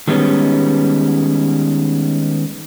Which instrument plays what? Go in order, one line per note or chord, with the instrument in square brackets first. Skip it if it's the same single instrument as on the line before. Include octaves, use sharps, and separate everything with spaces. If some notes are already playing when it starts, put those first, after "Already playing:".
[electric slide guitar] D#3 G3 G#3 B3 C#4